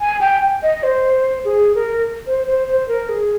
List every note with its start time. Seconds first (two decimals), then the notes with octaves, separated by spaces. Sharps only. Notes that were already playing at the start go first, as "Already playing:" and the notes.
0.01 G#5
0.21 G5
0.63 D#5
0.83 C5
1.45 G#4
1.75 A#4
2.27 C5
2.47 C5
2.68 C5
2.88 A#4
3.09 G#4